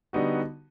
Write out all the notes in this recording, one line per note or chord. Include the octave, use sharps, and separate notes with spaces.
D3 G3 B3 D#4 F#4